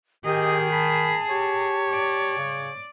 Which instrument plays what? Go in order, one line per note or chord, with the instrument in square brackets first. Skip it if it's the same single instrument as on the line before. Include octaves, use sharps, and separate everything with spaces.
[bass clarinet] D#3 [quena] G4 [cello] G#4 [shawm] D#5
[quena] A5 [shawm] B5
[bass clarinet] G4 [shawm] C#5
[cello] D5
[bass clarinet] C#3